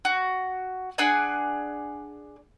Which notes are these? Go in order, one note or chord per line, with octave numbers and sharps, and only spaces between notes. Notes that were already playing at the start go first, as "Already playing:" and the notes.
F#4
D4 G#4 F#5 G#5